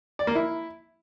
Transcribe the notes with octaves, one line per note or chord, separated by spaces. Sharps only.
D5
A#3
E4